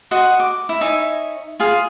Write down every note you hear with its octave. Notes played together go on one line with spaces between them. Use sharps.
F#4 D#5 F#5 C6
D6
E4
D#4 C#5 E5 G#5
F4 G#4 F5